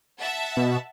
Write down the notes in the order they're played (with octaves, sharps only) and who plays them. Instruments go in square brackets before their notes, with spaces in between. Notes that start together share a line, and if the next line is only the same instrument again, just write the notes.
[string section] E5 F#5 A5
[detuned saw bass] B2